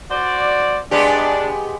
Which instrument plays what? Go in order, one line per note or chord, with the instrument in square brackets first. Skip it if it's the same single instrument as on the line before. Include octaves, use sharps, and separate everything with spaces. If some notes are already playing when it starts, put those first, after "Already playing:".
[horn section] F#4 C5 D5
[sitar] G#3 B3 G4 [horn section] D4 D5